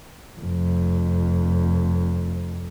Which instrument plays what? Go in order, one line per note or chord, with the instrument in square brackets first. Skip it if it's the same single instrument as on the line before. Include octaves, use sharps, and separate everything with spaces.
[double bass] F1 F2